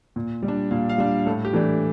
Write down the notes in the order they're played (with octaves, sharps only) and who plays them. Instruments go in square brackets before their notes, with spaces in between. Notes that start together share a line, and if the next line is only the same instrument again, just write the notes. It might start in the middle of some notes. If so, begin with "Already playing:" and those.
[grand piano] A#2
G3
D4
A#2 F5
F5
G3 D4
A2 A4
G4
E3 A3 D4
G4